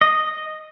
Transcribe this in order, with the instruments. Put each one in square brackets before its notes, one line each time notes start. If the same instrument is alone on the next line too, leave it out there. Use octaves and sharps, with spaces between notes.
[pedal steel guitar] D#5